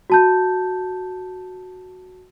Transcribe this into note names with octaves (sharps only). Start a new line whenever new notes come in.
F#4 A5 G6